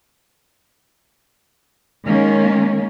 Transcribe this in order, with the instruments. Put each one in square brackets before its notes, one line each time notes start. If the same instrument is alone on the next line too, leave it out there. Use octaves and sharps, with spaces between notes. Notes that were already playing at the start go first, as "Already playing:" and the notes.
[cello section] D#3 G#3 A#3 C#4